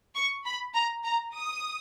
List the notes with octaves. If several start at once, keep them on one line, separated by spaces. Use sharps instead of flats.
C#6
B5
A#5
A#5
D#6